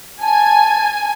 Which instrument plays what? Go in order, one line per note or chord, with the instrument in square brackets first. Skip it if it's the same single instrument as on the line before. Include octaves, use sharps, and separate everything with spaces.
[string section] G#5 [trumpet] A5